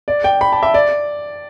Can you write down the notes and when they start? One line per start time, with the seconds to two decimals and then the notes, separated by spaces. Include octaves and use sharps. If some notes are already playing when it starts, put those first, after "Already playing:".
0.08 D5
0.24 G5
0.41 B5
0.52 A5
0.63 E5
0.74 D5